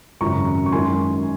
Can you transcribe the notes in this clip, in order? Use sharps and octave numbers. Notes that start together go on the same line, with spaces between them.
G#1 F#2 C#3 A#5 C#6
C#6
F#2 D#3 G#3 G#5 C6